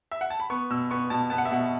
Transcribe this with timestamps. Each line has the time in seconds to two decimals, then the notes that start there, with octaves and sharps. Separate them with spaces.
0.11 E5
0.21 F#5
0.30 A5
0.40 B5
0.50 B3 C#6
0.70 B2 E6
0.91 B3 C#6
1.10 B2 A5
1.30 B3 A5
1.38 F#5
1.45 E5
1.51 B2 F#5